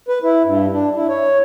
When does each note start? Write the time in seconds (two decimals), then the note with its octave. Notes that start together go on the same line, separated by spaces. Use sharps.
0.09 B4
0.23 E4
0.45 G2
0.73 D4
0.95 E4
1.09 C#5